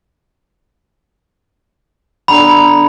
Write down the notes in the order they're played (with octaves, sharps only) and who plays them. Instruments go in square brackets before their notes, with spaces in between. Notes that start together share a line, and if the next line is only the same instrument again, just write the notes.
[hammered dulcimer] D3 B3 A#5 [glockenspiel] B5